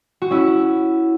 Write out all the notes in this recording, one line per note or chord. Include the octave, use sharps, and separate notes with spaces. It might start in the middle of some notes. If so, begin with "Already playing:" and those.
F#4
C#4 E4